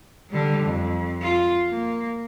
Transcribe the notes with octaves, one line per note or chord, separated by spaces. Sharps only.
D3 G3
F2
F4
A#3